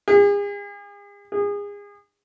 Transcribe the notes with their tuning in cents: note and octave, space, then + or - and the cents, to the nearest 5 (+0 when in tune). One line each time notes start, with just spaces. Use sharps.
G#4 -40
G#4 -30